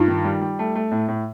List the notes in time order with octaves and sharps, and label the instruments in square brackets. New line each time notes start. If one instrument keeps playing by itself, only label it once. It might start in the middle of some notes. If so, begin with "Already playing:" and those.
Already playing: [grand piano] G2 [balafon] D#4 F4
[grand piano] D#3
G3
G3
A3
A3
A2
A2